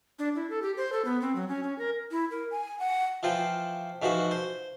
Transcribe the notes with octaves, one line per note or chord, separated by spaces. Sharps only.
D4
E4
A4
G4
C5
A4
B3
C4
F#3
C#4
C#4
A#4
E4
A#4
G#5
F#5
E3 F3 F4 G5
G#2 E3 F3 F#4
C5